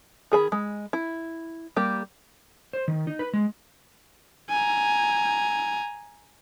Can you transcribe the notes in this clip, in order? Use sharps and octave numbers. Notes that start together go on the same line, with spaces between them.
D#3 G#4 B5
G#3
E4
G3 A#3 G4
C5
D#3
D#4
B4
G#3
G#5 A#5